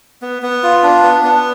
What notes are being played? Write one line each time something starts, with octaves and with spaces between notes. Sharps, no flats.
B3
B3
F4
D4
B3
B3